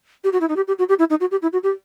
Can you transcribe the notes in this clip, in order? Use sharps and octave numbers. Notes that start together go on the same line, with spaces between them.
G4
F#4
E4
D#4
G4
G4
F#4
G4
E4
D#4
F#4
G4
E4
F#4
G4